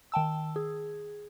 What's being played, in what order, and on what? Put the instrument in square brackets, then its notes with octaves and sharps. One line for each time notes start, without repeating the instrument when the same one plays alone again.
[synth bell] D#3 G5 A5 E6
G#4